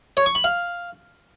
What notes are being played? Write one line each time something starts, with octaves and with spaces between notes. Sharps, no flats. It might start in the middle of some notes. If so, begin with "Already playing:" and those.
C#5
C#6
B5
F5